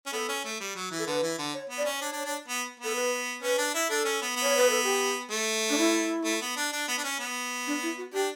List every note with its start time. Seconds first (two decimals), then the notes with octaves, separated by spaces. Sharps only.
0.06 C#4
0.13 B3 A4
0.29 C#4
0.45 A3
0.60 G3
0.76 F#3
0.91 E3
0.99 A4
1.07 D3 B4
1.23 E3
1.39 D3
1.54 C#5
1.70 B3
1.78 D5
1.85 C#4
2.01 D4 C#5
2.13 D4
2.25 D4
2.48 B3
2.80 B3 A4
2.95 B4
3.43 C#4 B4
3.58 D4
3.74 E4
3.90 D4 A4
4.05 C#4
4.22 B3
4.36 B3
4.43 C#5
4.57 B4
4.70 A4
4.84 G4
5.31 A3
5.70 D4
5.78 E4
6.25 A3
6.41 B3
6.57 D4
6.73 D4
6.88 B3
6.98 D4
7.04 C#4
7.20 B3
7.67 D4
7.83 E4
7.98 F#4
8.13 D4 G4